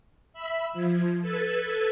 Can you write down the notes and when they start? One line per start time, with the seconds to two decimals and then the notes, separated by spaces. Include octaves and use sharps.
0.33 E5 B5 E6
0.73 F3 G#6
1.22 A4 B4 E6 G#6 A6